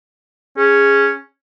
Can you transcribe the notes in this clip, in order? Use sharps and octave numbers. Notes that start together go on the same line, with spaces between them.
C#4 G#4